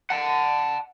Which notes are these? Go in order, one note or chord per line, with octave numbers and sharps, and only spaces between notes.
F#5 A5